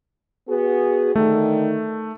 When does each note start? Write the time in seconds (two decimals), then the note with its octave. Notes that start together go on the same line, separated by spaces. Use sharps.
0.48 B3 F#4 G#4
1.16 D3 D#3 A3